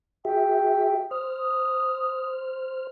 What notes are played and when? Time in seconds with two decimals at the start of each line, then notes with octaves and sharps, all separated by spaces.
0.25 F#4 G#4 E5 G5
1.11 C5 D#6 F6